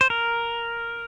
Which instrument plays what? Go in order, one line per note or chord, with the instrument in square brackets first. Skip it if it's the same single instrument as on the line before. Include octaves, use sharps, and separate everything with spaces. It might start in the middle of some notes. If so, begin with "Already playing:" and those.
[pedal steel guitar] C5
A#4